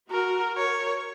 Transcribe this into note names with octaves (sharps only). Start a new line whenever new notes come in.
F#4 A#4
A#4 C#5